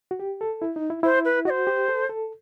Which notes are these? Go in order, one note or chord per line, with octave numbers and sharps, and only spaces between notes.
F#4
G4
A4
E4
D#4
E4
E4 C5
B4
F#4 C5 D#5
G4
A4
A4